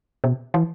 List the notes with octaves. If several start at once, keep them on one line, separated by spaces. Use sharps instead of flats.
B2
E3